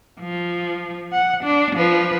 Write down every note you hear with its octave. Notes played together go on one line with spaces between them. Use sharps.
F3
F#5
D4
F3 B4